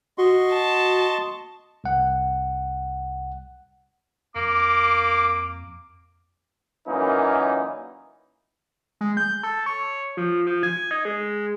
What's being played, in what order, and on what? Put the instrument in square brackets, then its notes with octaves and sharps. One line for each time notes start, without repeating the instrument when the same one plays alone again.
[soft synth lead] F#4 [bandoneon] D#5 C6 C#6
[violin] A5
[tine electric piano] C2 F#5
[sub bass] F2 [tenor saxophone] A#3 [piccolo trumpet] D6
[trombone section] F#2 A#2 E3 A#3 C#4 D#4
[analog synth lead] G#3
G6
A4
C#5
F3
F3
G#5
D#4
G#3